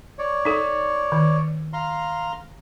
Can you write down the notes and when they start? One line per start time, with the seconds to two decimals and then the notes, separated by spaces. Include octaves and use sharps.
0.19 C#5 D5
0.45 D#4 A4
1.12 D#3
1.73 F5 A#5 C6